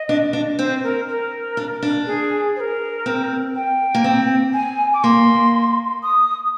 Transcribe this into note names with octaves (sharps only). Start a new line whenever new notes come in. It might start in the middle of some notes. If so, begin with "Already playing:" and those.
Already playing: D#5
D4
D4
C4 C5
A#4
A#4
D4
D4
G#4
C5
A#4
C4
G5
A#3
C4
G#5
D6
A#3 C6
D#6